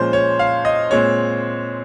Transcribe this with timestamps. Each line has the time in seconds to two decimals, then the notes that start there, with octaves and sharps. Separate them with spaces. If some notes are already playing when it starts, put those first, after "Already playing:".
Already playing: A#2 F3 G#3 C#4 C5
0.13 C#5
0.39 F5
0.65 D#5
0.91 A#2 G#3 C4 C#5